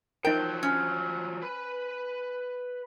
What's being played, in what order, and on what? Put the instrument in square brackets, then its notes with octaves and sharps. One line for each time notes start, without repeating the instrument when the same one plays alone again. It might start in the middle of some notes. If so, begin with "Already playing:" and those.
[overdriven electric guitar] F3 F#3 [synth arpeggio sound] D#4 A#4 [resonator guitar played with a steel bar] G5
[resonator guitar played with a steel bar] C#4
[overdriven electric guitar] B4 B5